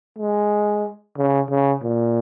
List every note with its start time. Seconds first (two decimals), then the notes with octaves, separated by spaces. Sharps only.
0.18 G#3
1.17 C#3
1.50 C#3
1.83 A#2